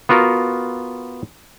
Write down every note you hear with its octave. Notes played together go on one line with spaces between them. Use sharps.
B3 F4 F#4 A#4